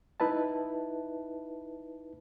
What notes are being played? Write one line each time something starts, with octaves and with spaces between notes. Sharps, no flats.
D#4 E4 B4 E5 A5